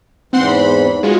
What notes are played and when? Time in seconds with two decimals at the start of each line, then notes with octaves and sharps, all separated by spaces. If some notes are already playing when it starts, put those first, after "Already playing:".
0.33 E2 G#2 E3 C4 F#5 C6
0.48 B5
1.03 G#3 F4 F#4